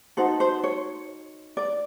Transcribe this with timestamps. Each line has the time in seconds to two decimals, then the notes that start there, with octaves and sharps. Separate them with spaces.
0.17 D#4 F#4 A4 C5
0.40 C5
0.64 C#5
1.57 D5